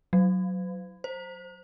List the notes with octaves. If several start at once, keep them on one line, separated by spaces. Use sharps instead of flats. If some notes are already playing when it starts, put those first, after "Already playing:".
F#3
C5